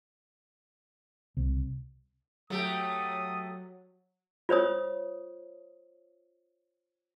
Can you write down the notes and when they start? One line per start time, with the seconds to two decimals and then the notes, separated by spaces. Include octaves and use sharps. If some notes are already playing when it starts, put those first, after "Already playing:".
1.37 C2
2.50 F#3 A3 G4 D#6
4.49 F4 C5 C#5 D#6